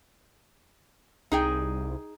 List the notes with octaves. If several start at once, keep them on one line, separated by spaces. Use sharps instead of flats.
C2 D#4 G#4 G5